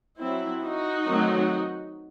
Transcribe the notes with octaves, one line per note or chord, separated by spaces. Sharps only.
F#3 C4 E4
D#4 F#4
D#3 F#3 A3 C4